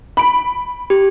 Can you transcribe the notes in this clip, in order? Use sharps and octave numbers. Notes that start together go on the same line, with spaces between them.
B5 D7
G4